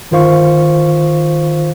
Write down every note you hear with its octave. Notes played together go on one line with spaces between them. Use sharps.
G1 D#3 F4 C5 F5 C#6